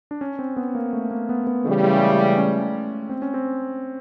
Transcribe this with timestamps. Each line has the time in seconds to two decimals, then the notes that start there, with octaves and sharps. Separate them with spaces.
0.11 D4
0.21 C#4
0.39 C4
0.57 B3
0.75 A#3
0.93 A3
1.11 A#3
1.29 B3
1.47 B3
1.65 C#3 E3 G3 A3
1.83 G#3
2.01 A3
2.37 C#4
3.09 C4
3.22 C#4
3.34 C4